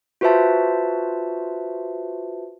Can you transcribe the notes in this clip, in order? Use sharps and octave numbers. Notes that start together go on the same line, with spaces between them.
F4 F#4 B4 C5 E5 A5